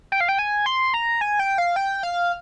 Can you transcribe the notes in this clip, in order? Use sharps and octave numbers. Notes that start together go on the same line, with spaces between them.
G5
F5
G5
G#5
C6
A#5
G#5
G5
F5
G5
F5